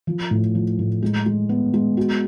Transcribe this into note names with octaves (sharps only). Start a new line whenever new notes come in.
F3
A2
F3
A2
G#3
G#3
B3
G#3
F#4